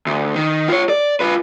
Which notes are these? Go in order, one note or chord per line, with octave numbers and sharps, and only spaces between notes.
D2
D#3
F4 C#5
D5
F4 B4